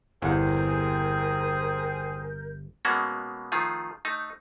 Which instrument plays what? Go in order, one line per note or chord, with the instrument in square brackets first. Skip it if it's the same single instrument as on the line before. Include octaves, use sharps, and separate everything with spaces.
[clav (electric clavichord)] G1 [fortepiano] E2 F#5 [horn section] C4 G#4 [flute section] A#4 G6
[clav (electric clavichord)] B2 G#3 A#3 B3 C#4 F#4
D#3 F3 A3 F4 G#4
A3 D#4